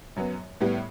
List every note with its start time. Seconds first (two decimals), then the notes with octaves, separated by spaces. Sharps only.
0.16 F#2 F#3 B3
0.61 A2 G3 B3